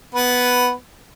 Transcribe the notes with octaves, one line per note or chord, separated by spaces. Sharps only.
B3 B4